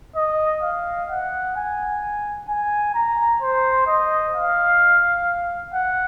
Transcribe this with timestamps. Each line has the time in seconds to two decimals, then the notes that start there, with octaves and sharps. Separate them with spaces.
0.16 D#5
0.63 F5
1.10 F#5
1.56 G#5
2.48 G#5
2.94 A#5
3.42 C5
3.87 D#5
4.35 F5
5.73 F#5